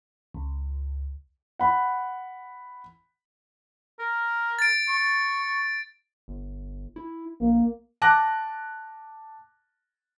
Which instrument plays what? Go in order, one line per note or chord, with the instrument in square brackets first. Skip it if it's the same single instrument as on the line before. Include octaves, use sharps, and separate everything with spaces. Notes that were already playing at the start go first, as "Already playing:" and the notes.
[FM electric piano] C#2
[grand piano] F#5 B5
[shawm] A#4
[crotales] A6 D7
[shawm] C#6
[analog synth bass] G1
E4
[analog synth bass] A#1 [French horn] A#3
[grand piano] A5 D6 F#6 A#6